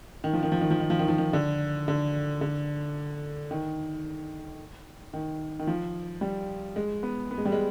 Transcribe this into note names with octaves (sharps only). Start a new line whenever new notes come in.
D#3
F3
D#3
F3
D#3
F3
D#3
F3
D#3
F3
D#3
D3
D3
D3
D#3
D#3
D#3
F3
G3
G#3
B3
B3
G#3
G3
G#3